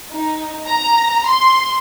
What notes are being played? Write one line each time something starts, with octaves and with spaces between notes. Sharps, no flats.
D#4
A#5
C6